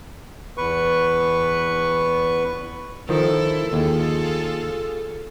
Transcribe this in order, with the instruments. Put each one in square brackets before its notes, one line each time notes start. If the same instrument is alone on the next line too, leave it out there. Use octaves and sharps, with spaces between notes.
[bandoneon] E2 B4 C#6
[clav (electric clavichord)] D#3 F3 [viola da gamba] E4 A4
[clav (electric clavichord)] D#2 [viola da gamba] F4 G#4 A4